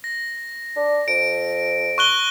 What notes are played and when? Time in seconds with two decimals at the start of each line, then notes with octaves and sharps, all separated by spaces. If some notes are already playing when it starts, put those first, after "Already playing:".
0.04 A#6
0.76 D4
1.08 F2 D7
1.98 C#6 F#6 G7